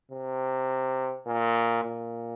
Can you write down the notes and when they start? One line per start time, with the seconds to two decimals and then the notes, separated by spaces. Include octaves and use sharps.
0.11 C3
1.27 A#2
1.84 A#2